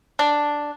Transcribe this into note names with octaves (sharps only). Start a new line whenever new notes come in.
D4